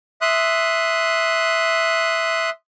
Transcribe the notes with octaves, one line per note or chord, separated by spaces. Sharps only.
E5 C6 D#6 F#6